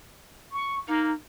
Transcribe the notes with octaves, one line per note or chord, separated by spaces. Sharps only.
C#6
A#3 D#4